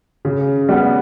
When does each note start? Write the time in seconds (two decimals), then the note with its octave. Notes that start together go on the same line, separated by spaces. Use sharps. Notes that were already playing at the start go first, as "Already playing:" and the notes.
0.25 C#3
0.69 G3 B3